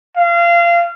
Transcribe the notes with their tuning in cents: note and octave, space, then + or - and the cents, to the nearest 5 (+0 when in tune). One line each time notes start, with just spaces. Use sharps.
F5 -25